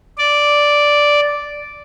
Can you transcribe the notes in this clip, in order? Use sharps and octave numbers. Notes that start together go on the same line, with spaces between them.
D5